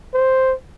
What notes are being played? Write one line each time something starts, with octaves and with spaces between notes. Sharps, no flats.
C5